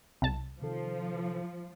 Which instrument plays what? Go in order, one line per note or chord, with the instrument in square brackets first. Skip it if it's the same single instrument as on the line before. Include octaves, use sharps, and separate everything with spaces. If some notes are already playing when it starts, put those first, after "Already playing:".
[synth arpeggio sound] C2 A5
[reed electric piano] C3 D#3 A4 [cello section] F3